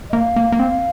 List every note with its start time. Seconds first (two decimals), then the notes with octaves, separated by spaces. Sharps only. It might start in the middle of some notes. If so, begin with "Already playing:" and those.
0.10 D#5
0.13 A#3 F5
0.36 A#3
0.52 A#3
0.59 C4